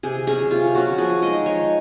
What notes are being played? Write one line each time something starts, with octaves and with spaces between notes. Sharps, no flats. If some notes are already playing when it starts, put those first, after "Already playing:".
C3 G#4
F#3 C#4 G#4
C3 F4
F#3 C#4 F#4
F3 G#4
G#3 D#4 D#5
F3 C#5